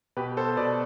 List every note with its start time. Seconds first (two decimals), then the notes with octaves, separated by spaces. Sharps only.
0.17 B2 G4 B4
0.37 A4 C5
0.56 B2 B4 D5